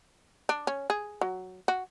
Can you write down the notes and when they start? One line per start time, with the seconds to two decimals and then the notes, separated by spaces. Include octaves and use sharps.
0.49 D4
0.67 C#4
0.90 G#4
1.21 F#3
1.68 F#4